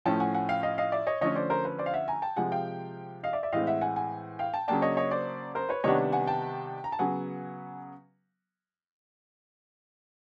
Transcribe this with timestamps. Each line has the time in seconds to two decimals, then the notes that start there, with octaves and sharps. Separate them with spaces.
0.05 A2 F3 A3 C#4 G5 A5
0.20 F#5 G#5
0.34 F#5 G#5
0.49 F5 G5
0.63 D#5 F5
0.78 D#5 F5
0.92 D5 E5
1.07 C#5 D#5
1.21 D3 F3 A3 C#4 C#5 D#5
1.35 C5 D5
1.50 A#4 C5
1.65 B4
1.79 C5 D5
1.86 F5
1.94 E5 F#5
2.08 G#5 A#5
2.22 G5 A5
2.36 C3 F3 G#3 F#5 G#5
2.52 F5 G5
3.23 D#5 F5
3.33 D5 E5
3.43 D5 E5
3.53 A2 E3 G#3 C4 D#5 F5
3.67 E5 F#5
3.81 F#5 G#5
3.96 F#5 G#5
4.39 F5 G5
4.54 G5 A5
4.68 C#3 F#3 A#3 D4 G5 A5
4.82 C#5 D#5
4.97 C#5 D#5
5.11 C5 D5
5.55 A#4 C5
5.69 B4 C#5
5.84 C3 D#3 G3 B3 D4 C#5 D#5
6.12 F#5 G#5
6.27 G5 A5
6.84 A#5
6.92 A5
6.99 C#3 F#3 B3 F#5 G#5